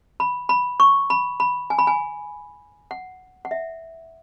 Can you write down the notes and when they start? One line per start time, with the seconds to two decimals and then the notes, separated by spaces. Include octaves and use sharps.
0.20 B5
0.49 B5
0.80 C#6
1.10 B5
1.40 B5
1.70 G#5
1.79 B5
1.87 G#5
2.91 F#5
3.45 F#5
3.51 E5